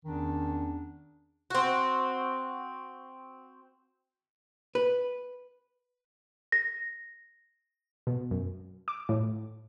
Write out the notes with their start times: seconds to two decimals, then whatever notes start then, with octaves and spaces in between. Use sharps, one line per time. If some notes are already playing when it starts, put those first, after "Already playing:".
0.05 E2 D#3 C#4 D4
1.50 C4 F#4
4.75 B4
6.52 A#6
8.07 B2
8.31 F#2
8.88 D6
9.09 A2